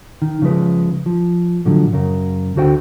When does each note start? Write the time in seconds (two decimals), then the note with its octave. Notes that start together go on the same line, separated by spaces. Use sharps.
0.22 D#3
0.42 C#3 F3 G#3 B4
1.06 F3
1.65 A2 D3 F3 F#3
1.93 F#2 C#3 A#4
2.56 D2 D3 F#4 C5 F#5 G5